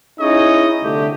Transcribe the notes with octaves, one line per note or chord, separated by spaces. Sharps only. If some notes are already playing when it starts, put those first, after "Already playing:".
C#4 D#4 E4 G#4 C#5 D#5
C2 D3 A3 G4